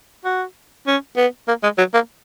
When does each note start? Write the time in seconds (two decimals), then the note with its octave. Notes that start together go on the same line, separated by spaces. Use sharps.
0.25 F#4
0.87 C#4
1.17 B3
1.48 A#3
1.63 G#3
1.78 F#3
1.94 A#3